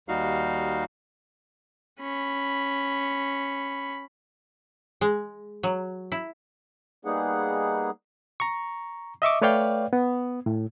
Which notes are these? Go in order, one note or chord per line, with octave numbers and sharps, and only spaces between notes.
D#2 G3 D#4 F#4 F5
C#4 B5
G#3
F#3
E4
G3 A#3 B3 D#4 G#4 F#5
A#5 C#6
D#5 E5 C#6 D6
A3 B4 C#5 D5 F5 G5
B3
A2